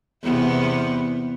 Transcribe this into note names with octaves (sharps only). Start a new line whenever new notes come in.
E2 C3 B3